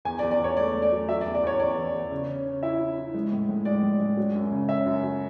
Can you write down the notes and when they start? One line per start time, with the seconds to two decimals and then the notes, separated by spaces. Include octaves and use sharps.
0.05 E2 G#5
0.19 D5
0.23 E2
0.31 D5
0.40 E2 C#5
0.57 A3 D5
0.74 A3
0.82 D5
0.92 F#3
1.08 F#3 E5
1.21 D5
1.25 E2
1.35 D5
1.43 E2 C#5
1.59 E2 D5
1.77 E2
1.94 E2
2.11 C#3
2.28 C#4
2.46 C#4
2.63 E4 E5
2.79 E4
2.98 E4
3.14 G#3
3.32 A2
3.49 A2
3.65 G#3 D5
3.83 A2
4.00 G#3
4.17 F#3
4.35 F#2
4.52 C#3
4.68 C#4 E5
4.86 F#2
5.03 F#3